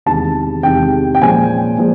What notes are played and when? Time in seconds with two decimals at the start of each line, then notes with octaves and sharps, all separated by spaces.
0.06 E2 C3 D#3 G#3 A5
0.63 E2 C3 D#3 G#3 G5
1.15 G5
1.21 A#2 F3 G#3 C#4 G#5
1.78 A#2 F3 G#3